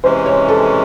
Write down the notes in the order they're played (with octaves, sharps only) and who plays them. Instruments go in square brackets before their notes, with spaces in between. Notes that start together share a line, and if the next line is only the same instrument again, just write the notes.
[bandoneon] C3 E3 G#3 C#4 [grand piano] C5
[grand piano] C#5
A4